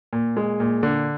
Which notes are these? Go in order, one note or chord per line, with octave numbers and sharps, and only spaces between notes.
A#2
G#3
A#2
D3